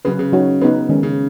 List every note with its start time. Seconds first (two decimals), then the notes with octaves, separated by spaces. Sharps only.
0.05 C#3 F#3 C#4 B4
0.19 C#3
0.33 F#3 D#4 F#4 C#5
0.61 C#3 B3 D#4 B4
0.89 D#3 G#3 C#4
1.03 C#3